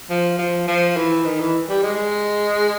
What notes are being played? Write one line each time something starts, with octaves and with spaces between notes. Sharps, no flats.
F3
F3
F3
E3
D#3
E3
G3
G#3